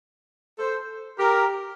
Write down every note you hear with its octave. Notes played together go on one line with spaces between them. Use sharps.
A4 C5
G4 A#4